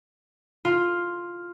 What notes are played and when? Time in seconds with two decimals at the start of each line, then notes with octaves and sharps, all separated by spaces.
0.65 F4